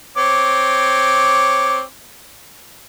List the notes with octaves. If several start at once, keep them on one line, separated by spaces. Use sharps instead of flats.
C4 C#5 D6